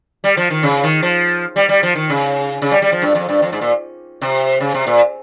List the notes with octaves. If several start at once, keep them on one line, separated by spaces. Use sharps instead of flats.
G3
F3
D#3
C#3
D#3
F3
G3
G3
F3
D#3
C#3
C#3
G3
G3
F3
G2
F2
G2
F2
G#2
A#2
C3
C#3
C3
A#2